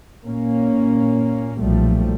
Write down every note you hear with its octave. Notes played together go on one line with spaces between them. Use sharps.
A#2 A#3 C#4
B1 A#2 F3 G3 A3